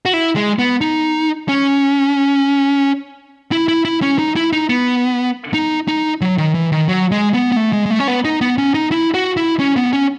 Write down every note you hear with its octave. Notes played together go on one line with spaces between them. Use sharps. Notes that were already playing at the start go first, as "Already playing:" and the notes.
F#4
E4
G#3
B3
D#4
C#4
E4
E4
E4
C#4
D#4
E4
D#4
B3
D#4
D#4
F#3
D#3
E3
D#3
F#3
G#3
B3
B3
A3
G#3
G#3
A3
C#4
B3
D#4
B3
C#4
D#4
E4
F#4
E4
C#4
B3
C#4